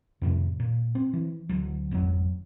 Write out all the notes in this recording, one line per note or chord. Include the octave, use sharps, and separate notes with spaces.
F2 A2 C3 D#3
A#2
C4
E3
D2 F#3
G#1 F2 D3 F#3